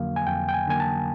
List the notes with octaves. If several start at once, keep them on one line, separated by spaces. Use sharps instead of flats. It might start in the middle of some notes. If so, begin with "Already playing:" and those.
Already playing: F2 D3 F#3 A#3 F5
G#5
F2 G5
G5
G#5
D3 F#3 A#3 G#5
A5